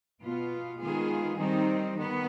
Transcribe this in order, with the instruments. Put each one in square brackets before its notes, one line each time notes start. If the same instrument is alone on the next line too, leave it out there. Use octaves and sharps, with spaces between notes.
[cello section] B2 B3 F4
D#3 G#3 B3 F4 G#4
D#3 G3 C4 D#4
D#3 B3